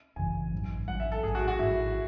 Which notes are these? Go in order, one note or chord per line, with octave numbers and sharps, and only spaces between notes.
G#1 F#2 C#3 E3 G#5
A1 G#2 F#3
A1 G#2 F#3 F#5
E5
A4
A1 G#2 F#3 G#4
F#4
F#4
A1 G#2 F#3 E4